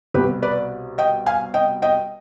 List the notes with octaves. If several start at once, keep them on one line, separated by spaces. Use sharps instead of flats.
C2 B2 G4 B4
B4 D5
D#5 G5
F5 G#5
D#5 G5
D#5 G5